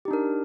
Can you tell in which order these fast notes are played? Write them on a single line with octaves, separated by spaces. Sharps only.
G4 D#4 D4 A#4